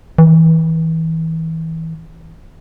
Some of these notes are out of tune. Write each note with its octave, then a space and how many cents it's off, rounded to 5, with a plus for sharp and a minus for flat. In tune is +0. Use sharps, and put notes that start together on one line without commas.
E3 -30